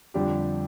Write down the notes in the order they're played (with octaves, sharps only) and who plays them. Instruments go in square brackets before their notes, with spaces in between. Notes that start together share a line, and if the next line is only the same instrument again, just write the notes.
[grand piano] F2 D3 G3 D4 G4